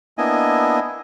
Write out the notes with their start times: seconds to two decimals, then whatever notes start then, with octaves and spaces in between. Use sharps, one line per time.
0.18 A#3 B3 D4 E4 D#5 G#5